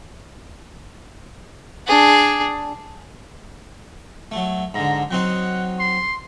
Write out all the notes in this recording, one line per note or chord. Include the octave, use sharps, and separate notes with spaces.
D4 G#4
F#3 A3
G#2 D3 A#5
F#3 C4 D#4 F#5
C6